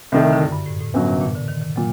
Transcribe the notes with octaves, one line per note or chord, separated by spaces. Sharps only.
C2 C3 D#3 A3
D3
D3
F#2
G2
A2
A2
G1 F#2 F#3
C3
A#2
D3
D#3
D#3
A#2 F#3